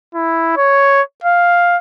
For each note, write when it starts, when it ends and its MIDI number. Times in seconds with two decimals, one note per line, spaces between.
0.15 0.54 64
0.57 1.02 73
1.24 1.77 77